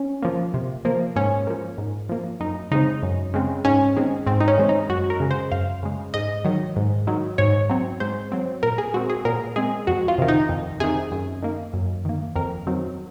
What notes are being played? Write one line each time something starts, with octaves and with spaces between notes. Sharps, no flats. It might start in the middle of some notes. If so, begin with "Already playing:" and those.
Already playing: C#4
F3 A#3
C3
F3 A#3
G#2 C#4
F3 A#3
G#2
F3 A#3
F#2 D#4
C#3 G#3 C4 D#4
F#2
C#3 G#3 C4
G#2 C#4
D#3 G#3 C4
G#2 C4
D#4
C#4
D#3 G#3 C4
D#4
F#2 F#4
A#4
C#3 G#3
C5
F#2 F5
C#3 G#3
G#2 D#5
D#3 F#3
G#2
D#3 F#3
G#2 C#5
F#3 C4
G#2 C5
F#3 C4
A#2 A#4
G#4
G#3 C4 F#4
G#4
A#2 A#4
G#3 C4 G#4
F2 F#4
F4
C3 D#3
D#4
F2
C3 D#3 G#4
F#2
D#3 A#3
F#2
D#3 A#3
F2 A#4
D#3 F#3 C4